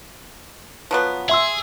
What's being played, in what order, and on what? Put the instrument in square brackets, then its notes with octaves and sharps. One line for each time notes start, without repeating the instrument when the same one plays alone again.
[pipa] F3 F#3 B3
[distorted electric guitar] G#4 [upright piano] E5 C6 E6